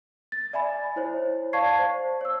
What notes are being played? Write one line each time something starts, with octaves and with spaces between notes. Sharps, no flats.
A6
D5 E5 G#5 B5
E4 C5 C#5
D5 F5 A5 C#6 G#6 C7
C5
C#5 E6